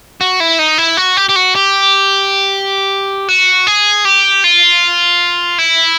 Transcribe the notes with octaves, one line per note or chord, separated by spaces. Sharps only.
F#4
E4
D#4
E4
F#4
G4
G4
F#4
G4
F#4
G#4
G4
F4
E4